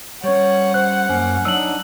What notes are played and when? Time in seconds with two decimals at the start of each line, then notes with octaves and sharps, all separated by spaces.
0.24 G3 C#4 C#5 F#5
0.74 C5 F#6
1.09 F#2 A#3 C#4
1.45 F#3 D4 D#4 E6 F#7